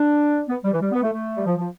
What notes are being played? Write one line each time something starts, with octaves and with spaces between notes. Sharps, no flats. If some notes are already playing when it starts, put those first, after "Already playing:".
Already playing: D4
B3
G3
E3
G3
B3
A3
A3
G3
F3
F3